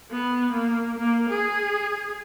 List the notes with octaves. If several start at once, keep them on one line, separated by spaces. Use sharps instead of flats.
B3
A#3
A#3
G#4